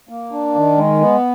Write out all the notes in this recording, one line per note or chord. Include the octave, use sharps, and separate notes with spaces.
A#3
D4
D#3
G#3
B3